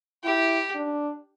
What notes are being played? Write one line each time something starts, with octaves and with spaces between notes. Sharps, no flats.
E4 G4
D4